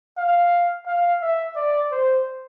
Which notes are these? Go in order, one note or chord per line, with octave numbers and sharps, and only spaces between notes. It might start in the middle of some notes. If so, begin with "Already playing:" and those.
F5
F5
E5
D5
C5